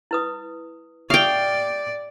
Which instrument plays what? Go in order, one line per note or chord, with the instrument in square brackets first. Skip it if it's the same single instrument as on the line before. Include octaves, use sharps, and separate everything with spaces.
[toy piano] E4 B4 D#6
[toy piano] G4 E5 D#6 [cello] D5 [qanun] F5 G5